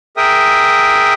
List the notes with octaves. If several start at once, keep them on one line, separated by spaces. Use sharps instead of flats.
G#4 A#4 E5 G5 D#6